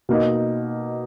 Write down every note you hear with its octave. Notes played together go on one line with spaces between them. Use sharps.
B2 A#3 D#4